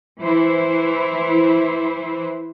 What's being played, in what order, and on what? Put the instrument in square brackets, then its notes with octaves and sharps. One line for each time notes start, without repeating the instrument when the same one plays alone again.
[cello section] E3 E4 C5